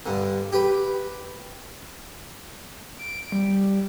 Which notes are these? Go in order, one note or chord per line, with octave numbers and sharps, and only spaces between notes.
G2 D3
G4 B4
D7
G3